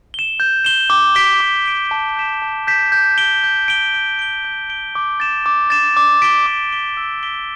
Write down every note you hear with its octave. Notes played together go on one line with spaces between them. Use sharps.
E7 G7
G6
E7 G7
D6
B6 D7 G7
D6
B6 D7 G7
A5
G6 B6 E7
A5
G6 B6 E7
G6
D7 G7
G6
D7 G7
G6
D7 G7
G6
D7 G7
D6
A6 E7
D6
A6 E7
D6
B6 D7 G7
D6
B6 D7 G7
E6
B6 D7 G7